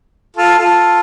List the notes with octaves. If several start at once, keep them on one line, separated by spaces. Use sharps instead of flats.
F4 A4
F4 A4